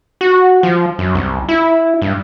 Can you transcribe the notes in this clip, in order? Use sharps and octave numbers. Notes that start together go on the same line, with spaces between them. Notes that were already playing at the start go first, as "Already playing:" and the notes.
F#4
F3
F#2
C2
E4
G2